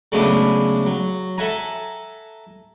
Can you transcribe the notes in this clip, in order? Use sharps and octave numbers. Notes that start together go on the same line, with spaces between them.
C#3 F#3 G#3 A3 B3 D4
F#3
A4 E5 F#5 G#5 A#5